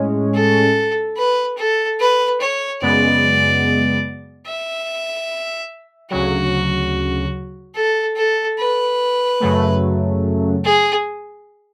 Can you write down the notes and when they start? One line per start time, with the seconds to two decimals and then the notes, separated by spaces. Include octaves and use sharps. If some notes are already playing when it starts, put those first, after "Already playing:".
Already playing: A2 G#3 C#4
0.35 A4
1.17 B4
1.58 A4
2.00 B4
2.41 C#5
2.82 F#2 C#3 G#3 B3 D5
4.47 E5
6.11 D2 C#3 F#3 F#4
7.75 A4
8.17 A4
8.58 B4
9.40 F#2 C#3 F#3 A3
10.64 G#4